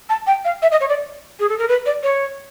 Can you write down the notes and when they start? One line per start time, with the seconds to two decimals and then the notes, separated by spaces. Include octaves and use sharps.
0.09 A5
0.26 G5
0.44 F5
0.62 E5
0.71 D#5
0.80 C#5
0.88 D5
1.39 G#4
1.49 A4
1.58 A#4
1.68 B4
1.86 D5
2.03 C#5